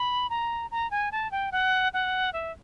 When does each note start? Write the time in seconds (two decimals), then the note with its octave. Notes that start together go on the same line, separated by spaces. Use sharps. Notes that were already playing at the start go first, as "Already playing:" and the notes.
Already playing: B5
0.30 A#5
0.71 A#5
0.91 G#5
1.12 A5
1.32 G5
1.52 F#5
1.94 F#5
2.33 E5